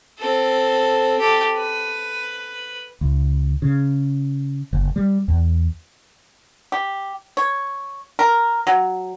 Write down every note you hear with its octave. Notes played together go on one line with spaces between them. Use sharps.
C4 A4
G4 A4
B4
C#2
C#3
F#1
G3
E2
G4
C#5
A#4
F#3